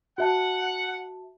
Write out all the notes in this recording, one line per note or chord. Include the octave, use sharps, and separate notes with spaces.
F#4 E5 F#5 A5